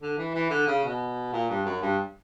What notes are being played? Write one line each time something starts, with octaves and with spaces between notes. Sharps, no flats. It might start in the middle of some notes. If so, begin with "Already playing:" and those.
D3
E3
E3
D3
C#3
B2
A#2
G2
F#2
G2